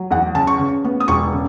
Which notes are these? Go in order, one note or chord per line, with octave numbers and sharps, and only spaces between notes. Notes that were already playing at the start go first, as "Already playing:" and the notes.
Already playing: F#3
E2 F#5
C#3 A5
C#6
C#3
B3
D#6
E1 C#6
C#3